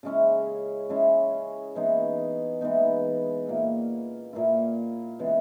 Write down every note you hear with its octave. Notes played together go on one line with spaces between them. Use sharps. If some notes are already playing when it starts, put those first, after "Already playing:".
C#3 G#3 C#4 E4
C#3 G#3 C#4 E4
E3 G#3 B3 D#4
E3 G#3 B3 D#4
A#2 A#3 E4
A#2 A#3 E4
C#3 E3 G#3 B3